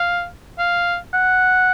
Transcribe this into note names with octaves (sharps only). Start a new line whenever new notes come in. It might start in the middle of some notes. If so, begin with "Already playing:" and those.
Already playing: F5
F5
F#5